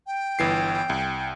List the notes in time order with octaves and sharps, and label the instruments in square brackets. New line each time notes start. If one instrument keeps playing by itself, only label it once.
[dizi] G5
[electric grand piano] G1 E3 C7
C2